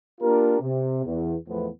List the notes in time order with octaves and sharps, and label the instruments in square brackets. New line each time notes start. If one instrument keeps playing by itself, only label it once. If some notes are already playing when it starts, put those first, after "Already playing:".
[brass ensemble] A#3 D4 F4 G4 A#4
C3
E2
E2 A2 F3 B3